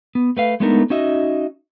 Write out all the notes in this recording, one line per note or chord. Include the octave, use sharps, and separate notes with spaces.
B3
A3 B4 F5
G#3 A3 B3 D4 D#4 A#4
C#4 D#4 F#4 D#5 E5